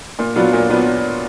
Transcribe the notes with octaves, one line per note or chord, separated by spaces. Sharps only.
A#2
F#3 B3 D4 F4
A#2
F#3 B3 D4 F4